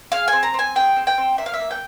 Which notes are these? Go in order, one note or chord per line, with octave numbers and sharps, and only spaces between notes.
G#4 F5
C4 G#5
A#5
C4 G#5
G#4 G5
C4
G5
C4
A#3 E5
F5
E5
A#3
G5